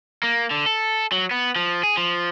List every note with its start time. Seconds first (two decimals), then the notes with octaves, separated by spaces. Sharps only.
0.23 A#3
0.51 D3
0.66 A4
1.12 F#3
1.31 B3
1.56 F3
1.83 G#4
1.97 F3